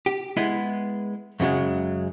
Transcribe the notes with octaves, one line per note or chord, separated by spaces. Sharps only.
G4
G#3 B3 E4 B4
F#2 C#3 F#3 G#3